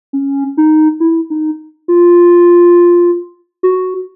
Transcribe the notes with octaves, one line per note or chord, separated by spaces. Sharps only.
C#4
D#4
E4
D#4
F4
F#4